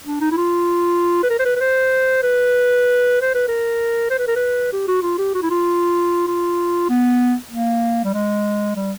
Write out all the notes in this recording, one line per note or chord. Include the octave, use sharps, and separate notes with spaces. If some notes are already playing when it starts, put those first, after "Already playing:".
D4
D#4
E4
F4
B4
A#4
C5
B4
B4
C5
B4
C5
B4
A#4
C5
B4
A#4
B4
G4
F#4
F4
G4
F#4
E4
F4
F4
B3
A#3
G3
G#3
G3